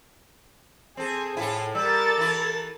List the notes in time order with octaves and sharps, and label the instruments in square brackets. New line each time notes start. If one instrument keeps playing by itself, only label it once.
[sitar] C4 A4 [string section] G#4
[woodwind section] A2 [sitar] E4 F4 A4
[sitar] G3 [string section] A4 A#4 A6 [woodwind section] E6
[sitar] E3 E4